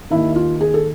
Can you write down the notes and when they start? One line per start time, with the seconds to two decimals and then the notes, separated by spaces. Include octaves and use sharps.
0.10 D#2 D#3 E4
0.36 F4
0.61 G#4
0.74 A4